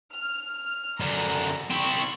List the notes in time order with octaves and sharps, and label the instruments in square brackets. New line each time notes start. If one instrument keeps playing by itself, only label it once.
[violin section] F6
[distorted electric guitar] F#2 D3 [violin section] A#5
[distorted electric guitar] C4 E4 [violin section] C#6